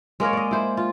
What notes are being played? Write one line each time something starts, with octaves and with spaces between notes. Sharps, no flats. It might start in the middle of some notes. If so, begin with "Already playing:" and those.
G#3 A#3 A#4 C#5
D5 D#5
E4 C5
F4